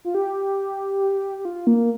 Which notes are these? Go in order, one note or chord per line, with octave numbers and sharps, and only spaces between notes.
F4
G4
G4
F4
A#3